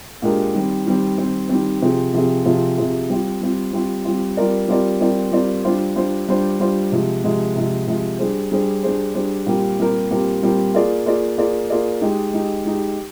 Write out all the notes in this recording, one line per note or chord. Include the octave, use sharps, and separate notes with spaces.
A#2 G#3 D4 G4 A#4
D#3 G3 C4
D#3 G3 C4
D#3 G3 C4
D#3 G3 C4
C3 F3 C4 F4 G#4
C3 F3 C4 F4 G#4
C3 F3 C4 F4 G#4
C3 F3 C4 F4 G#4
G3 C4 F4
G3 C4 F4
G3 C4 F4
G3 C4 F4
G3 C4 F4 A#4 D5
G3 C4 F4 A#4 D5
G3 C4 F4 A#4 D5
G3 C4 F4 A#4 D5
G3 D4 F4 C5
G3 D4 F4 C5
G3 D4 F4 C5
G3 D4 F4 C5
C3 F3 G#3
C3 F3 G#3
C3 F3 G#3
C3 F3 G#3
G3 D4 G#4 C5
G3 D4 G#4 C5
G3 D4 G#4 C5
G3 D4 G#4 C5
A#2 G3 C4 G4 A#4
A#2 G3 C4 G4 A#4
A#2 G3 C4 G4 A#4
A#2 G3 C4 G4 A#4
A#3 F4 G#4 D5
A#3 F4 G#4 D5
A#3 F4 G#4 D5
A#3 F4 G#4 D5
G#3 D#4 G4
G#3 D#4 G4
G#3 D#4 G4